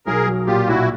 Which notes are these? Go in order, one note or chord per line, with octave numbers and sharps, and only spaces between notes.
B1 G#4 A#4
F#3
A#2 F4 G4
B1 E4 F#4